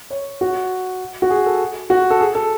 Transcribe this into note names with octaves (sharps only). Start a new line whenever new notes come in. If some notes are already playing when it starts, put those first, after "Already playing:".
C#5
F#4
F#4
G#4
A4
F#4
A4
G#4
A4